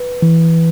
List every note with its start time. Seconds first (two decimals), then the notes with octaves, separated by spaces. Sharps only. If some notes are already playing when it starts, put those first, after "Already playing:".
Already playing: B4
0.22 E3